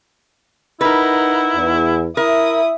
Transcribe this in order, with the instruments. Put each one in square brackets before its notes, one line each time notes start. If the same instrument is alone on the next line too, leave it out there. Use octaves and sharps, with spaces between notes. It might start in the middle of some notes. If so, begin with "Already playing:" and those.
[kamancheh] D#4 F#5 [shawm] E4 [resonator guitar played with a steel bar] A#4 B4
[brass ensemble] E2
[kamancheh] E4 D#6 [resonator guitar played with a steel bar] A#4 [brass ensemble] E5